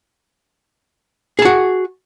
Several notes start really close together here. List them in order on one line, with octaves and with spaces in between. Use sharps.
G#4 A5 F#4